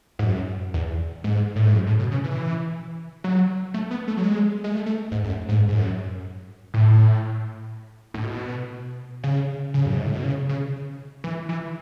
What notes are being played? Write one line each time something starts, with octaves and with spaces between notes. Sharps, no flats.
G#2
F#2
E2
G#2
A2
G#2
F#2
A2
B2
C#3
E3
F#3
A3
B3
A3
F#3
G#3
G#3
A3
A3
G#2
F#2
G#2
G#2
F#2
A2
A2
B2
C#3
C#3
F#2
G#2
A2
B2
C#3
C#3
E3
E3